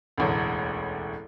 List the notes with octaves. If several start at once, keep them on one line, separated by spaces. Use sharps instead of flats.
E1 A1 D2